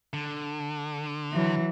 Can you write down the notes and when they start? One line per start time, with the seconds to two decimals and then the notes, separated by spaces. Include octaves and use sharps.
0.13 D3
1.32 E3 F#3